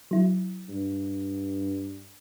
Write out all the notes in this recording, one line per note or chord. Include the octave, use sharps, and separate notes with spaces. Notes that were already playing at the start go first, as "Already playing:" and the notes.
F#3 E4
G2